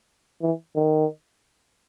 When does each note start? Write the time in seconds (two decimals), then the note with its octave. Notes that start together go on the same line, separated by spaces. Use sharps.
0.42 E3
0.75 D#3